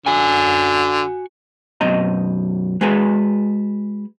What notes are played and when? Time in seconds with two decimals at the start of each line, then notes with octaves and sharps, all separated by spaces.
0.06 D3 F#4 G#5
1.81 F#2 B2 C4 D#5 A#5
2.81 G#3 F#4 G#4 A4 B4 G#5